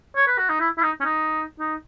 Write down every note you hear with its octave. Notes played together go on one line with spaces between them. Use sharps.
C#5
B4
F#4
D#4
E4
E4
D#4
C#4
D#4
D#4